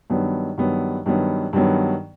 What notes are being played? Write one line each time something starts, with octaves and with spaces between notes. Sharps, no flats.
G2 D#3 F#3 B3
G2 D#3 F#3 B3
G2 D#3 F#3 B3
G2 D#3 F#3 B3